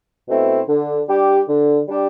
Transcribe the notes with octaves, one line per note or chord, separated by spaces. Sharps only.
B2 A3 C4 E4
D3
G3 D4 G4
D3
G3 D4 G4